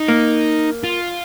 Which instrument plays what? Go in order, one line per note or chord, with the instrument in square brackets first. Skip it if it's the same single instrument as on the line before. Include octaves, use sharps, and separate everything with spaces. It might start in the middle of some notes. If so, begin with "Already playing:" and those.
Already playing: [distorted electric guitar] D#4
[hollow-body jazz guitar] A#3
[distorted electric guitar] F4